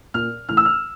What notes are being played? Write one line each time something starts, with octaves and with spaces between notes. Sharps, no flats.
A#2 F6
A2 E3 F6
E6
F6